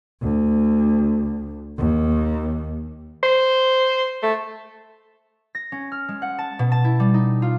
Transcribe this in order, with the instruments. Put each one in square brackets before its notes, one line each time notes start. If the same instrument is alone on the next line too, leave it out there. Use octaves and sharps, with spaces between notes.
[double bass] D2
D#2
[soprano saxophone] C5
A3
[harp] A#6
C#4
F6
G#3
F#5
A5
B2
A5
E4
G3
D#4
F4